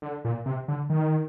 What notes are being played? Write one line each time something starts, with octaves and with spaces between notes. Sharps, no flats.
D3
A#2
C3
D3
D#3